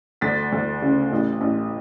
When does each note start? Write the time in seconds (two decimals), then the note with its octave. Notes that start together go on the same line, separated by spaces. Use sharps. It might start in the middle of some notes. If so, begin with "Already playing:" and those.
0.21 D2 A6 B6
0.52 D2
0.82 C#3
1.12 A1
1.41 A1